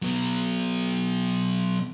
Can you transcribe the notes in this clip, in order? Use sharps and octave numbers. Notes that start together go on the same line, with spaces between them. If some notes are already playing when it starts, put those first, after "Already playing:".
F#3 B3